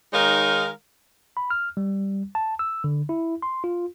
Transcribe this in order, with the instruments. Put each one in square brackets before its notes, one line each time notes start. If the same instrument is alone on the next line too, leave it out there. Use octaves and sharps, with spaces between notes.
[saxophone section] D#3 G#3 D#4 A#4 C#5 F5
[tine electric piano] B5
F6
G3
A5
E6
D3
E4
C6
F4